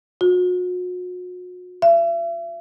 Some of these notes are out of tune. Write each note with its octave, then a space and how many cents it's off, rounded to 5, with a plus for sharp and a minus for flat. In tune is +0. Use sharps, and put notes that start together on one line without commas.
F#4 -40
E5 +40